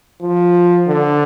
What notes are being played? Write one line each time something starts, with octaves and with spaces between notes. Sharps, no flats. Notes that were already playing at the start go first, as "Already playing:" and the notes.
F3
D3